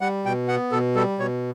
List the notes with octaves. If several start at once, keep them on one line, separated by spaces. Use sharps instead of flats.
G3 F#5
B2 G5
B3 F#5
B2 A4
G3 A4
B2 C#5